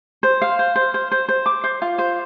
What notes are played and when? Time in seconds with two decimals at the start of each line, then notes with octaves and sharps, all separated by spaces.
0.23 C5
0.42 F5
0.59 C5
0.76 C5
0.94 C5
1.12 C5
1.29 C5
1.46 D6
1.64 C5
1.82 F4
1.99 C5